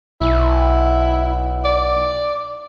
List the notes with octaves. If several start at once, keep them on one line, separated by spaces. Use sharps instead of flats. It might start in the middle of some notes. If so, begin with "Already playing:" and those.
B1 E4
D5